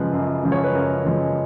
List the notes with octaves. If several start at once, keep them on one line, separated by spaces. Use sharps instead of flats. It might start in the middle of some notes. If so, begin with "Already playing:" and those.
Already playing: F#2 C#3 F3 G#3 B4
F#2
C#3 F3 G#3
C#5
B4
F#2 A#4
C#3 F3 G#3